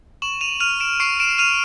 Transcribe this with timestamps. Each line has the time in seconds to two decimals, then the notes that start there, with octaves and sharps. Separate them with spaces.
0.22 C#6 E7 F#7
0.41 D#7 F7
0.60 F6 D#7 F7
0.80 D7 E7
1.00 C#6 C7 D7
1.20 D7 E7
1.38 F6 D#7 F7